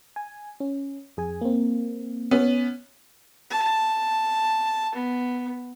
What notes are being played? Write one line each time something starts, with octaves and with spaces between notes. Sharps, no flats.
G#5
C#4
F2 G#4 G#5
A#3 C4
B3 C#4
A5
B3